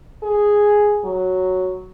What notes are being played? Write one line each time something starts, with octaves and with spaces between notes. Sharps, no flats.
G#4
F#3